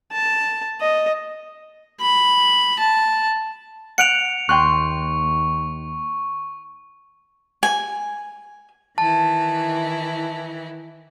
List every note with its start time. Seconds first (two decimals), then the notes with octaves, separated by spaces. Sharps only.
0.12 A5
0.81 D#5
2.01 B5
2.79 A5
3.98 F#5 F#6 C#7 D7 F7
4.49 D#2 G5 C6 C#6 F#6
7.63 G#5
8.98 D#3 E3 E4 A5